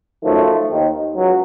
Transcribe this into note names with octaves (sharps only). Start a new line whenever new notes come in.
F#2 D#3 F3 A3
D#2 D#3
C#2 F#3